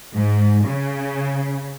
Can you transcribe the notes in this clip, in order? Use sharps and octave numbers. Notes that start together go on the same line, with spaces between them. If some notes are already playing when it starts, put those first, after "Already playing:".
G#2
C#3